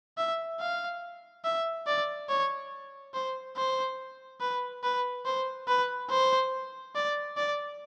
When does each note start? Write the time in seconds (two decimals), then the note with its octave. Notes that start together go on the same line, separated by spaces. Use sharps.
0.18 E5
0.60 F5
1.45 E5
1.87 D5
2.29 C#5
3.14 C5
3.57 C5
4.41 B4
4.83 B4
5.25 C5
5.68 B4
6.10 C5
6.95 D5
7.37 D5